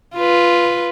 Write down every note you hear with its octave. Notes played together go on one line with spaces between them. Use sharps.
F4 B4